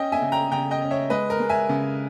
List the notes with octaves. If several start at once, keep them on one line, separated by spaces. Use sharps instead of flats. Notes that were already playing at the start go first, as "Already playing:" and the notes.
Already playing: C#4 D#5 G5
E5 G#5
C#3
G5 A#5
C#3 G5 A#5
D#5 G5
C#4
C#5 E5
G#3 B4 D#5
A#4
G#3
E5 G#5
C#3